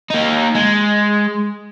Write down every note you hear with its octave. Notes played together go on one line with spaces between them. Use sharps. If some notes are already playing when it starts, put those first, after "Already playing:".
A#3 D#4
G#3